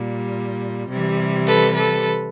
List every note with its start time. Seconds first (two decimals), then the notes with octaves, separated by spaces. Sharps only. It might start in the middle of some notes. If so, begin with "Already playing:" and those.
Already playing: A#2 G3
0.89 C3 E3 G3
1.47 A4 B4
1.75 A4 B4